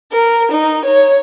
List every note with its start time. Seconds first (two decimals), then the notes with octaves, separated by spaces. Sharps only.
0.12 A#4
0.52 D#4
0.85 C#5